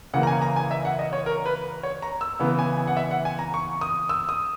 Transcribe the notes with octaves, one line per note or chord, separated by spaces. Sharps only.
C#3 E3 A#3 F#5
A#5
G#5
A#5
G#5
E5
F#5
D#5
C#5
A#4
B4
C#5
A#5
E6
C#3 E3 B3
G#5
G#5
F#5
E5
F#5
G#5
A#5
C#6
D#6
E6
D#6